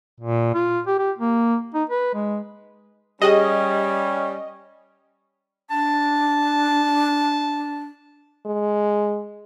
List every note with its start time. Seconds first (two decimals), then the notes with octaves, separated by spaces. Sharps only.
0.20 A#2
0.54 F4
0.87 G4
0.98 G4
1.18 A#3
1.74 D#4
1.89 B4
2.15 G#3
3.22 G3 C#4 G4 G#4 D#5 G5
5.70 D4 A5
8.46 G#3